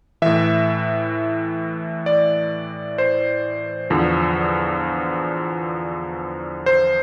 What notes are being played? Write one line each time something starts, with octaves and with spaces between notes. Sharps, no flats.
A2 E3 E5
D5
C5
E2 D3 F3
C5